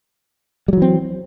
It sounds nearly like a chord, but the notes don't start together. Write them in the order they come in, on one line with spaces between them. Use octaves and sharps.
G3 F#3 E3 C4